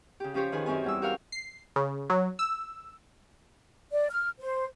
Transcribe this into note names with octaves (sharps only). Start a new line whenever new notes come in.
C#3 G4
F3 C#4 G4 C5 C#5
D#3 G#4 B4 G#5
F#2 C4 C#4 G#5
E2 G3 E6
F#4 G4 A#4 C#5 F5 F6
C7
C#3
F#3
E6
D5
F6
C5